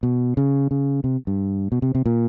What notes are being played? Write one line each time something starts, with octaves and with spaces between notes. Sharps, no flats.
B2
C#3
C#3
C3
G2
B2
C3
C3
A#2